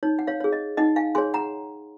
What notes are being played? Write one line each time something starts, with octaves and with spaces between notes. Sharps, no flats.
D#4 C#5
F#5
C#5 F5
G#4 C#5
D#5
D#4 D#5 F#5
F5 G#5
G#4 C#5 G#5 C6
F#5 A#5